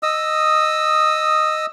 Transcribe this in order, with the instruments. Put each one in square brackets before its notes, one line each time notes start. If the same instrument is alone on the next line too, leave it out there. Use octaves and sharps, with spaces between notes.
[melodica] D#5 D#6 E6